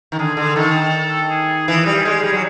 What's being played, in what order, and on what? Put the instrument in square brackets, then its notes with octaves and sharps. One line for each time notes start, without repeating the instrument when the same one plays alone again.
[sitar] D#3
[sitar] D3 [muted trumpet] G#4
[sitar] D3
[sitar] D#3 [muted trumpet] A4
[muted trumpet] G#4
[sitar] E3 [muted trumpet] G#4
[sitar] G3
G#3
G3
F#3